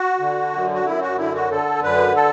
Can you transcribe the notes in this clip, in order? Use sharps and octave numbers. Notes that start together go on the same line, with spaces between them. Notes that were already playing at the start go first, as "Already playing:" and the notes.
Already playing: F#4
D3
F#2
F#4
F#2 E4
F#4
D3 E4
F#4
D3 A4
F#2 B4
A4